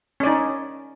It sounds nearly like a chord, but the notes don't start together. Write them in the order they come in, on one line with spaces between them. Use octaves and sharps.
C#4 D5 D#4